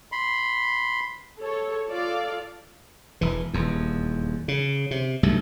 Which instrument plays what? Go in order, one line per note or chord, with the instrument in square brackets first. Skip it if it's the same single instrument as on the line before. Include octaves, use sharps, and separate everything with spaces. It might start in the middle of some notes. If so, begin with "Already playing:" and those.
[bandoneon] B5 C6
[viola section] A4 C#5
F4 A4 D5 F5
[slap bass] E1 E3
D#1 E2
C#3
C3
B1 G2 C3 A3